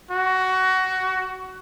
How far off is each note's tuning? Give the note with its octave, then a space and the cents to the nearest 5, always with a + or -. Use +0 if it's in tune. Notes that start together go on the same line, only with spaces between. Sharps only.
F#4 +15